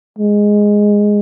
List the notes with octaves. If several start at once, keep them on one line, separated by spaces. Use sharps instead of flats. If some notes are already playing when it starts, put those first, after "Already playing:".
G#3